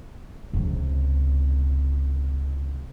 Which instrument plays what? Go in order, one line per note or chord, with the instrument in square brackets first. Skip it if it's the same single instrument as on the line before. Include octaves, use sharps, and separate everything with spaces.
[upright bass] C#2 C3